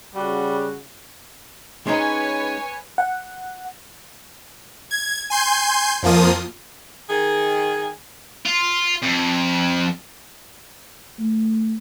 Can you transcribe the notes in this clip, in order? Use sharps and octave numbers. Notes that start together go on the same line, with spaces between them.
C#3 G3 F#4
G#3 C#4 D#4 B4 C#5 G#5
F#5
G#6
G#5 C6 G6
F2 F3 A#3 F4 D#6
D#3 G#4
F4
F2
A3